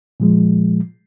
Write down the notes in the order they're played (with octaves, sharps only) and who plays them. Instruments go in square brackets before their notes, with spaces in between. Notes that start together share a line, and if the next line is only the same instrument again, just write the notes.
[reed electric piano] A#2 F3 G#3